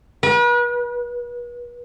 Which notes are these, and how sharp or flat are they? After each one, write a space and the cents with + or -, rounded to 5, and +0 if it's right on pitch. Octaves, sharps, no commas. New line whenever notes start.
B4 -40